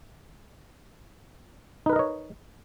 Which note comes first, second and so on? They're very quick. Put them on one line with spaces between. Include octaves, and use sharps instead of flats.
D#4 B4 A#4 D#5 C#5